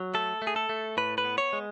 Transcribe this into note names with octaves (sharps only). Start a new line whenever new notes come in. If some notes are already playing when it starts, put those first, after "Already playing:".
Already playing: F#3
A3 A4
A3
G#4
A4
A3
A2 B4
B4
B3
C#5
G#3